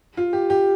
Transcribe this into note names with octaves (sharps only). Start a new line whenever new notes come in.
F4
G4
G4